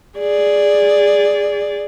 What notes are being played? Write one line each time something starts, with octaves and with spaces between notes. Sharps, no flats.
G#4 D5